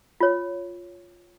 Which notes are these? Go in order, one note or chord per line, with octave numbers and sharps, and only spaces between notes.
F4 C#5